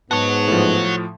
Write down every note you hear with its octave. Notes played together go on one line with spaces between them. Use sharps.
G#2 B3 F#4 C#5 A5
A2 F3